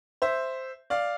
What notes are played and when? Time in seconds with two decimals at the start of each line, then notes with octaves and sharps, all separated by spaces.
0.22 C5 E5
0.90 D5 F5